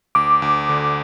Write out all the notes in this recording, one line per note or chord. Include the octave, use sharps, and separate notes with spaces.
D2 D6
D2
D3